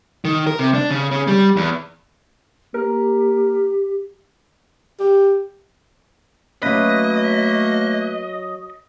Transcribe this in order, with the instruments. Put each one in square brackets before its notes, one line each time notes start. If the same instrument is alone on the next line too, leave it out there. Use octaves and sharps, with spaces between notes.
[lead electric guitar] D#3
A#4
C3
D4
C#3
C#3
G3
E2
[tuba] A#3 [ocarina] G4 [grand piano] A#4
[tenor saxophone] G4
[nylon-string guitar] F#3 C#4 [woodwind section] A3 A#3 [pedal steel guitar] B4 [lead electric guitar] D#5